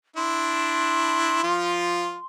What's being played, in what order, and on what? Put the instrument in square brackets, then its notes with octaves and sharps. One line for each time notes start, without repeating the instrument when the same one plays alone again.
[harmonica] D4 E4 [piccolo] C6
[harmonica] F3 F4